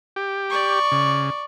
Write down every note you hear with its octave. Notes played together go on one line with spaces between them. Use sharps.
G4
D5 C#6
C#3